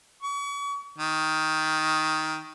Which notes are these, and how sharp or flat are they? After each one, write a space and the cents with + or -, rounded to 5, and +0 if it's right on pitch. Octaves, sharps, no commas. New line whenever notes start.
C#6 +40
D#3 +10